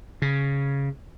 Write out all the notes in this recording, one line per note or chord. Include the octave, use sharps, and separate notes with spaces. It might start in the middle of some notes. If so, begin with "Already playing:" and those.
C#3